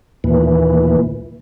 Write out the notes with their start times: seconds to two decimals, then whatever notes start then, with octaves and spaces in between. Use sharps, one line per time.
0.24 D#2 A#2 E3